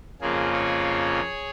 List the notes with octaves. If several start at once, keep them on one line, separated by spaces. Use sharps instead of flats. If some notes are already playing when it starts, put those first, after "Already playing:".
F2 C#3 A#3 F4 G#4
G#4 C#5